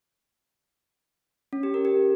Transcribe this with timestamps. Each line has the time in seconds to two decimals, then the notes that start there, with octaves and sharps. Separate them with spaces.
1.53 C#4
1.63 G4
1.74 A#4
1.85 G4